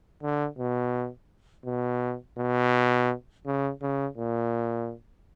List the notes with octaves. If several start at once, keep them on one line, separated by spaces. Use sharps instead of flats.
D3
B2
B2
B2
C#3
C#3
A#2